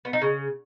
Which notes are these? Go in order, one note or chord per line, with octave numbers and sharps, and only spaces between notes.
B3
D#4
C#3